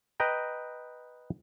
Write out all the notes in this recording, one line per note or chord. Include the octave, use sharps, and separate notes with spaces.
B4 D#5 G5 A#5